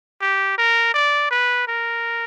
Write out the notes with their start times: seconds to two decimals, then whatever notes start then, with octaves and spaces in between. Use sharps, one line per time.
0.21 G4
0.58 A#4
0.94 D5
1.31 B4
1.68 A#4